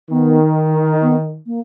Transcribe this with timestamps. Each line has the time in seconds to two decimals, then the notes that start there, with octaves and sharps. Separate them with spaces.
0.11 D#3 B3
1.02 B3
1.46 A#3